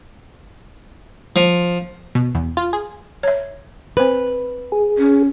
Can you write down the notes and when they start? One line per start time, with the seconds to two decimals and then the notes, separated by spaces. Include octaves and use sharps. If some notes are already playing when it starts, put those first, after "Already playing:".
1.36 F3
2.15 B2
2.35 E2
2.57 F4
2.73 G#4
3.23 C#5 E5
3.97 C4 B4 C5
4.72 G#4
4.98 C#4